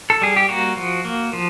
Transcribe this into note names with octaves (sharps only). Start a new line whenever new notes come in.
A4
G3 G#4
G4
A#3 F#4
F3
A#3
F3